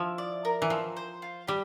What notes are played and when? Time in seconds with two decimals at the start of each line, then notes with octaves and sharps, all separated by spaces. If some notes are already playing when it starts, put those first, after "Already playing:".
Already playing: F3 E4
0.18 D5
0.45 A#4
0.62 E3
0.70 F3 C4
0.97 C5
1.22 F4
1.47 G3 G4